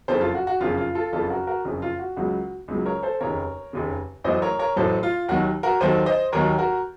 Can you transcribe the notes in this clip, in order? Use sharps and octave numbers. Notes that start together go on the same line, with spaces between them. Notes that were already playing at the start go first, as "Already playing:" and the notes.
F#1 F2 C#3 A4 C5
F4 A4
F#4
F#4
F#1 F2 C#3 F4
F4
F4 A4
F#1 F2 C#3 F4 A4
F#4 A#4
F#4 A#4
F#1 F2 C#3
F4
F#4
C#2 C#3 F#3 F#4
C#2 C#3 F#3
A#4 C#5
A4 C5
F1 D#2 C#3 A#4 C#5
F1 D#2 C#3
A1 A2 F#3 C5 D#5
A#4 C#5
A#4 C#5
A1 A2 F#3 A4 C5
F4
D#2 D#3 F#3 F#4
F#4 A#4
D#2 D#3 F#3 A4 C5
C5 D#5
D#2 D#3 F#3 A#4 C#5
F#4 A#4